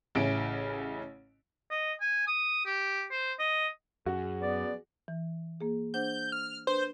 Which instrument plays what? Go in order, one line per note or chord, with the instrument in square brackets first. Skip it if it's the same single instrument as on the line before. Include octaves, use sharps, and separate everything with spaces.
[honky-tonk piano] A1 C#3 C#4 E4 D7
[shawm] D#5
G#5
D#6
G4
C5
D#5
[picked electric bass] F#2 [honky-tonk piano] F#4 [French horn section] G#4
[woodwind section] B3 D5
[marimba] E3
A#3 G#4
[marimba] D4 C5 F#5 [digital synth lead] G6
[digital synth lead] F6
[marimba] D4 B4 [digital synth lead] C5